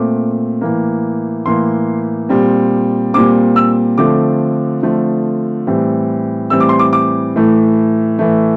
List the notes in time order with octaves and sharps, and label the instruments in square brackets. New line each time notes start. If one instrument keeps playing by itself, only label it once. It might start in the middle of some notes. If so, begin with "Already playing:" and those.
Already playing: [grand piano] A#2 A3 C4 D6
A2 E3 A#3
A2 E3 A#3 C6
A#2 G3 C4
A#2 G3 C4 D6
E6
D3 F3 A3 C4 D6
D3 F3 A3 C4
A2 E3 G3 C4
A2 E3 G3 C4 E6
D6
C6
D6
D6
A2 E3 A3
A2 E3 A3